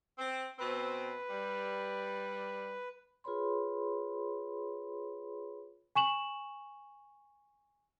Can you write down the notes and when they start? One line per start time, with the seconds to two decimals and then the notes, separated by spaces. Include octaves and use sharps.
0.19 C4
0.59 B2 C4 B4
1.30 G3
3.24 F4 G#4 B4 C#5 B5 C6
5.96 G#5 C#6 E7 F#7